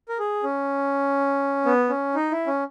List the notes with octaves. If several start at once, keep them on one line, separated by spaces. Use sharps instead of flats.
A#4
G#4
C#4
B3
C#4
D#4
E4
C#4